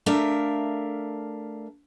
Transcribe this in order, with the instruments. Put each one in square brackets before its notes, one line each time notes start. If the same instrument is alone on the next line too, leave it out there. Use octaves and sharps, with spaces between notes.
[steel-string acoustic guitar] A3 D4 A#4 E5 F5